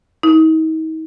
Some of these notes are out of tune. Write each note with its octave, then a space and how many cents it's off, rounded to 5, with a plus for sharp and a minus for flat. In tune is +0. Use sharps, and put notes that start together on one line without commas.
D#4 +40